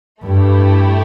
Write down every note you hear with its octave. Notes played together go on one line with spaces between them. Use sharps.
G2 A3 E4 G4